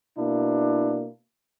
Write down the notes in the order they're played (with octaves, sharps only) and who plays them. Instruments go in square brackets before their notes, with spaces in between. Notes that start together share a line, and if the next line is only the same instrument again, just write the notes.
[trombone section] B2 A#3 D4 E4